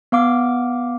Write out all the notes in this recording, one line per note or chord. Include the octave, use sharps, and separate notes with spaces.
B3 F5 D6